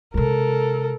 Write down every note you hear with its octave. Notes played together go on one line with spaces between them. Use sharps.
C3 G#3 A4 A#4